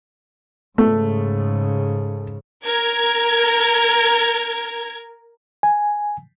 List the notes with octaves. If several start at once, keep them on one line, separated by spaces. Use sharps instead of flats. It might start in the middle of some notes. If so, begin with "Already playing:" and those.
G#2 C#3 A3
A#4 G#6
G#5